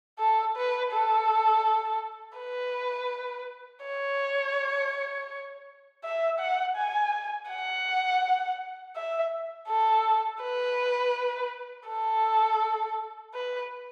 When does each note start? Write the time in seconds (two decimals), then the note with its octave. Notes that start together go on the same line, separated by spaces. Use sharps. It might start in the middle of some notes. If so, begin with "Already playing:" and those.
0.19 A4
0.57 B4
0.93 A4
2.38 B4
3.85 C#5
6.04 E5
6.40 F#5
6.76 G#5
7.49 F#5
8.96 E5
9.69 A4
10.43 B4
11.89 A4
13.34 B4